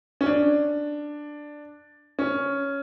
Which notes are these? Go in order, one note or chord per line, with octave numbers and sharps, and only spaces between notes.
C#4
D4
C#4